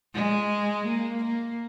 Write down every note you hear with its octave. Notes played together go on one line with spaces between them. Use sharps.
G#3
A#3
A#3